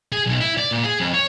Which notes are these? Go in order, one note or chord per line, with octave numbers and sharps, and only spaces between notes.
G#4
B1
E4
D5
A#2
G#4
F2
C#5